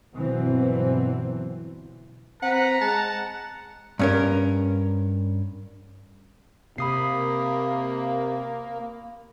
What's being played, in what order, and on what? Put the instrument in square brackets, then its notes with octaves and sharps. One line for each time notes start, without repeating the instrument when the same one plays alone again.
[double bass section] G1 B2 E3 F#3 C4
[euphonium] C4 [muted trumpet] B4 [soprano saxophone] F#5 [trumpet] A#5
[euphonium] G#3 [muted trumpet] F#5 [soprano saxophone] A5
[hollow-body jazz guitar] G2 C#4 A#4
[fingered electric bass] C3 [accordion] A#3 [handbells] B5 D#6 C7